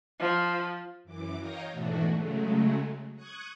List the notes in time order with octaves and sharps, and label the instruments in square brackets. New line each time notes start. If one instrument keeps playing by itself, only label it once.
[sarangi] F3
[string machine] F#2 E3 D6
C#5 D#5 F5 G5 A#5 A#6
G#2 B2 E3 A3 D4 F#4
C#3 F#3 G#3 A3
C#6 D#6 F#6 G#6